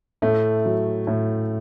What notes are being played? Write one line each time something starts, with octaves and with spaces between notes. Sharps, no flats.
A2 A3
F#3
A2